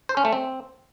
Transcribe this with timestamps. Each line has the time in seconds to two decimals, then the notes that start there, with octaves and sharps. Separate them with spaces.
0.09 C5
0.17 C#4
0.25 A3
0.33 C4